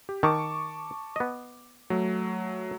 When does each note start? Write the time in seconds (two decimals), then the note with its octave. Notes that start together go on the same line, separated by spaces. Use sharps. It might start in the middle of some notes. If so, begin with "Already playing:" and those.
0.09 G4
0.23 D#3 A5 C#6 D6
1.16 B3 D#5
1.90 F#3 A3